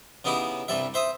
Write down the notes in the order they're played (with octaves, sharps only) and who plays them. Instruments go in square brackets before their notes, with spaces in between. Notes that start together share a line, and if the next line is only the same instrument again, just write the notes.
[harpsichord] C#3 B3 D#4 E4 G4
C2 G2 G3 E5
C5 E5 D#6